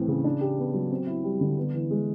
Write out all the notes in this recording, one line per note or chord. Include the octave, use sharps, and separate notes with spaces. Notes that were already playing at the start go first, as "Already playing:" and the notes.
Already playing: A2 E3 A3 C4
C#3
D4
G4
B3
F#3
C4
E4
G3
D3
B3
E3
G#3